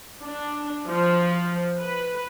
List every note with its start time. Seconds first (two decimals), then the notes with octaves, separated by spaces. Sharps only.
0.22 D4
0.88 F3
1.80 B4